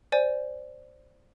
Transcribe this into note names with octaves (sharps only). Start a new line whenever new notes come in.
C5 D5 G#5